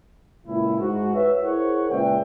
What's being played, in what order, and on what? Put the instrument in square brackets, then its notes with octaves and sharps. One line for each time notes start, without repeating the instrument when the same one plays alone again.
[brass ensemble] C#2 A#2 E4
G#2 F#4
B4 C#5 E5
E4 G#4 A#4 C5 C#5 F#5
C#2 A#2 B4 D5 E5 G5